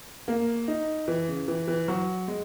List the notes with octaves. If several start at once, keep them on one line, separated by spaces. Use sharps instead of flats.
A#3
D#4
E3
C#3
E3
E3
F#3
G#3